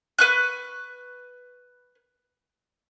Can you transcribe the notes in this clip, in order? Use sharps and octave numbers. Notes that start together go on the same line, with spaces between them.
B4 C#6 F#6